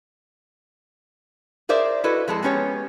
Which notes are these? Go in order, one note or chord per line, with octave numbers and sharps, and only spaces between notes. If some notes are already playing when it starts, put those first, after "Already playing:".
G#4 A#4 C5 D5 E5
E4 F#4 A4 B4 D#5
F2 G#3 A4 A5
G#3 B3 C#4 G4 C#5